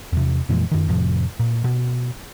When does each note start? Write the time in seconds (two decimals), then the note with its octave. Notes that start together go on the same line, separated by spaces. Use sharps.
0.12 E2 C3
0.49 F2 A#2 E3 G#3
0.71 F#2 D#3
0.89 F2 A2 C3 F3
1.40 A#2
1.64 B2